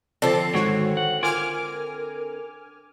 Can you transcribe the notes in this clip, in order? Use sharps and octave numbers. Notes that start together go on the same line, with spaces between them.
D3 F3 C4 F4 A4 D5 A5
G#2 D#3 F#4 C#5
F#5
F4 A#4 G#5 D6 F6